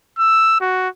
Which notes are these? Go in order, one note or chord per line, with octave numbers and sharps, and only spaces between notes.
E6
F#4